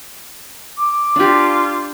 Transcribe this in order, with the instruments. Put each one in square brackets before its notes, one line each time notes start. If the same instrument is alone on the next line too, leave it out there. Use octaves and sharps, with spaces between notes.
[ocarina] D6
[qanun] D4 G4 [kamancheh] F4